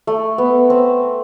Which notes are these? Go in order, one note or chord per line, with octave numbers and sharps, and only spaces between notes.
A3
B3
C4